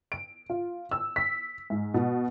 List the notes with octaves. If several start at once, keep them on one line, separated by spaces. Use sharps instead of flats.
D7
F4
E6
B6
G#2
B2